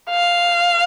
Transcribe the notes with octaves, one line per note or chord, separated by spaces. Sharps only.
F5